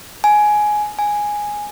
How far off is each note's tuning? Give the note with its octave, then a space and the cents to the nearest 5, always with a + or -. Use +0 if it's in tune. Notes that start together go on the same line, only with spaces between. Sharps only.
G#5 +10
G#5 -5